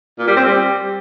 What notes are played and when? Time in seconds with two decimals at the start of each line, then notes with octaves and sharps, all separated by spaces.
0.19 A#2
0.28 G3
0.37 C4
0.45 G3